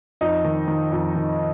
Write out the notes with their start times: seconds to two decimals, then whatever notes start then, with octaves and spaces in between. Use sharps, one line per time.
0.21 F2 D#4
0.44 D#3
0.68 D#3
0.92 F2
1.16 D#3